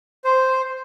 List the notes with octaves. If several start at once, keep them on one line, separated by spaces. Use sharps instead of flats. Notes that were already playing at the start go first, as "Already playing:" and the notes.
C5